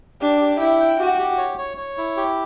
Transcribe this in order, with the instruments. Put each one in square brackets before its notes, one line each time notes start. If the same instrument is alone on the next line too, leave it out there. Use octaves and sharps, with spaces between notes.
[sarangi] D4 [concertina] G4
[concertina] G4
[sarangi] E4 [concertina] G5
[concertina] G5
[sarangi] F#4 [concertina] G4
[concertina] G4
C#5
C#5
C#5
E4
G4